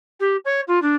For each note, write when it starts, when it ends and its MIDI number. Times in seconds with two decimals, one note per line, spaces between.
0.20 0.36 67
0.45 0.61 73
0.67 0.81 65
0.82 0.95 62